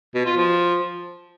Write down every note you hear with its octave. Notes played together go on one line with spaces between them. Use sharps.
B2
F4
F3